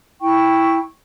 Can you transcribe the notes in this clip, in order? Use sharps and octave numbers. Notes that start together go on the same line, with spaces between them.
E4 G5 C#6